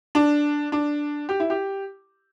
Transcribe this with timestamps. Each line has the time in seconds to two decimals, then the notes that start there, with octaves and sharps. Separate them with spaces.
0.15 D4
0.72 D4
1.29 G4
1.40 E4
1.50 G4